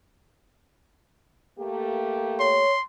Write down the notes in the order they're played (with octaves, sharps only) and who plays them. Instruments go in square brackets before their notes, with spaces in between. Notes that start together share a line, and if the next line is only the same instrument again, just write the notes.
[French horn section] A3 A#3 G4
[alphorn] C#5 [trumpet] C6